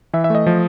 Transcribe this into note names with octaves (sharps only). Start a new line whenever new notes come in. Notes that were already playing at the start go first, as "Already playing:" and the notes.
E3 E5
E5
A3 D#5
F3